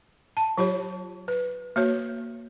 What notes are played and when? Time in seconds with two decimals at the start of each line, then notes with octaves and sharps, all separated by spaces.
0.37 A5
0.57 F#3 F4 G4 C#5
1.28 B4
1.76 A#3 F#4 C#5